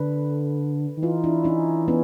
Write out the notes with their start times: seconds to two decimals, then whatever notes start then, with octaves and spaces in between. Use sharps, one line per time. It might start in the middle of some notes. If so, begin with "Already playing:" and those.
Already playing: D3 A4 B4
0.97 D#3
1.03 E3 D#4 F4
1.24 D4 E4
1.44 C#4 D#4
1.88 B3 C#4